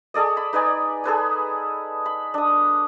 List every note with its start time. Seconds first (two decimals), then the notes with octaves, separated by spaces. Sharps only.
0.14 G#4 A4 D5 D#5
0.37 B5
0.53 D#4 B4 D5 G#5
1.04 G#4 A4 B4 G#5
2.06 B5
2.34 D4 D#6